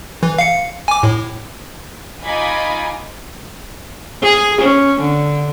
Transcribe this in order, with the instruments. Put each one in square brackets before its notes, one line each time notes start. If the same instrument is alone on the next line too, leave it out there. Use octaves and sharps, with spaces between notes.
[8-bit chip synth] E3
F5 C#7
G#5 D6
A2
[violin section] D#4 F4 D#5 G#5 B5 D6
[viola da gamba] G#4
C#4
D3